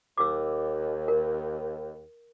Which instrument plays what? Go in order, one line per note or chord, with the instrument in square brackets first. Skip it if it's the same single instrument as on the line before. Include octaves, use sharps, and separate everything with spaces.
[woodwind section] D#2 [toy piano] D6 E6
[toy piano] A#4